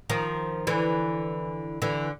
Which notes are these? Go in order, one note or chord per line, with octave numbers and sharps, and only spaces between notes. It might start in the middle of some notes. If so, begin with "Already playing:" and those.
D#3 F3
D3 E3
D3 E3